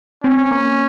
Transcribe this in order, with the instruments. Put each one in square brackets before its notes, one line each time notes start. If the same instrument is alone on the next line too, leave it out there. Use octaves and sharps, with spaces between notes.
[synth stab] C4 [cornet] C#4
[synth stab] A#3